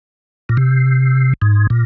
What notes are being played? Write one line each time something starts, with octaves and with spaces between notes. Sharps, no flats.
A#2
C3
G#2
A#2